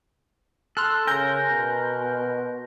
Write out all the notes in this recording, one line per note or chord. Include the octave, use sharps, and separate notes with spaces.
A4 C6 F6 F#6
C#3 A#4 G#5 A#5 G6
B2